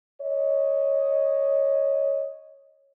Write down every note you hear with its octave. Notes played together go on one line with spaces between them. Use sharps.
C#5 D#5